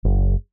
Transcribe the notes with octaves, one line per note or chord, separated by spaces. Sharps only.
F#1